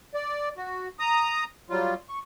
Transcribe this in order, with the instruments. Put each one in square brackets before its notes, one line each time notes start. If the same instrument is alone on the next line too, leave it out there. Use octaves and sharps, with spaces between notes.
[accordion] D5
F#4
A#5 D#6
F#3 G3 F4
C#6